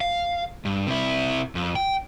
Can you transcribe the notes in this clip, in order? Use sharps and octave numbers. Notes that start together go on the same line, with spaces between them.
F5
G2
C3 E4
F2
G5